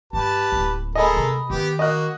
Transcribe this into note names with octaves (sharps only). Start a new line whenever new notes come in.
G2 G4 B4 A5
D1 A#3
G#3 A4 A#4 D#5 G#5 B5
C3
D#3 B3 G4
A#3 F#4 D#5 F#6